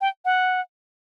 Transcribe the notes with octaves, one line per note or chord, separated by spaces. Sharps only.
G5
F#5